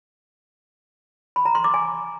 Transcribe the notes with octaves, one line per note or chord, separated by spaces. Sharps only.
B5
A#5
C6
D6
G#5